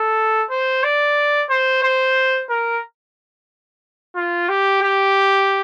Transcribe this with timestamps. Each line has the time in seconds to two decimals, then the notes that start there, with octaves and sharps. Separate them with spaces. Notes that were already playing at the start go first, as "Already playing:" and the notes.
Already playing: A4
0.50 C5
0.84 D5
1.50 C5
1.83 C5
2.50 A#4
4.16 F4
4.49 G4
4.82 G4